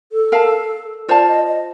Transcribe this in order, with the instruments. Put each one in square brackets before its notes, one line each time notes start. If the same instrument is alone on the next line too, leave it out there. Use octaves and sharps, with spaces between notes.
[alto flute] A4
[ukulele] A#4 F5 A5
[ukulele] F4 C5 F5 A5 [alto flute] D5
[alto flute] D#5
D#5